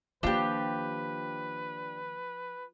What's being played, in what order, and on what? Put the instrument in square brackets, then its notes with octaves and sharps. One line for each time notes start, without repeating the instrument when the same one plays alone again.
[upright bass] D#3 A#3 [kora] F3 [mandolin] D4 G4 [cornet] B4